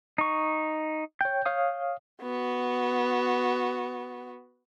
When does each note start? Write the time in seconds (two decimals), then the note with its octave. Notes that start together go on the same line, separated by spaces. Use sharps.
0.18 D#4 C#6
1.21 C#5 G5 G6
1.46 C#5 F5 D#6
2.22 B3 F#4